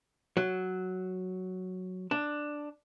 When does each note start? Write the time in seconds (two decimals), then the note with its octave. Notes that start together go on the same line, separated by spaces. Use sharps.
0.37 F#3
2.11 D4